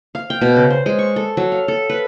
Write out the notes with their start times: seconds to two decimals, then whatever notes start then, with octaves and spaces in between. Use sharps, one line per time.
0.15 F5
0.30 G5
0.41 B2
0.56 C#3
0.70 C5
0.86 G#3
0.99 C#6
1.16 A4
1.37 F#3
1.52 F5
1.68 A4
1.89 B4